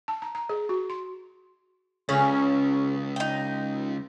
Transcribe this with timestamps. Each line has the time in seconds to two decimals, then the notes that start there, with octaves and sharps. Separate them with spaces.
0.08 A5
0.22 A#5
0.35 A#5
0.49 G#4
0.69 F#4
0.90 C6
2.09 C#2 C#3 C#4 C#5
3.16 D#4 G5